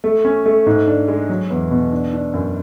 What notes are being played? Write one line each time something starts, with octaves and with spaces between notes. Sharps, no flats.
A3
C#4
A3
G#2
D4
G#3
F#3
E2
B2
D4
D4
F#2